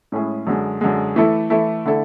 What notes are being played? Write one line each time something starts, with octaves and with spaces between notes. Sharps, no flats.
A2 G#3 C#4 E4 G#4
F#2 D3 G#3
F#2 D3 G#3
E3 A3 E4 A4
E3 A3 E4 A4
D3 A3 E4 A4